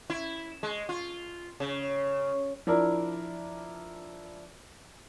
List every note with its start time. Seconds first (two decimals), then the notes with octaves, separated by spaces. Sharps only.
0.10 E4
0.63 G#3
0.89 F4
1.60 C#3
2.67 F3 D4 E4 A#4 D5